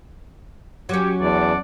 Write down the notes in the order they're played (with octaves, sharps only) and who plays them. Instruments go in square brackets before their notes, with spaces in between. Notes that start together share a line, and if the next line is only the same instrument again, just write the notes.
[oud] F#3 C#4 [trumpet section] G4
[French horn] E2 [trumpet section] D5 F#5 A5